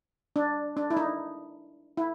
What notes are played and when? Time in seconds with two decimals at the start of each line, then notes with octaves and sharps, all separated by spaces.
0.36 D4
0.77 D4
0.90 E4
0.97 D#4
1.97 E4